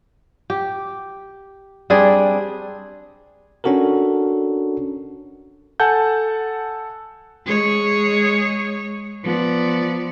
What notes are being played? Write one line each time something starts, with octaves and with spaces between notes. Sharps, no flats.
G4
G3 C4 D4 G#4
C#4 D4 F#4 A4 A#4
A4 F#5 G#5 A5 G6
G#3 G#4 C#5
F3 B3 D5